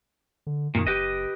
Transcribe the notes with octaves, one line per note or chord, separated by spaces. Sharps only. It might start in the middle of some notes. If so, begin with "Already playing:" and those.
D3
F#2 A#2 D#3
F#1 G4 B4 D#5